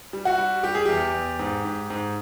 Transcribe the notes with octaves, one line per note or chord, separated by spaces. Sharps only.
G3
F#4
G3
G3 G4
G#4
E2 G4
E2
G#2
G#2
G#2